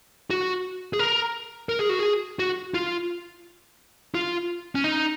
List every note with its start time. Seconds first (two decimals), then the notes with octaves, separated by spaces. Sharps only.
0.30 F#4
0.93 G#4
0.99 A#4
1.69 A#4
1.79 G#4
1.89 F#4
1.99 G#4
2.39 F#4
2.74 F4
4.15 F4
4.75 C#4
4.84 D#4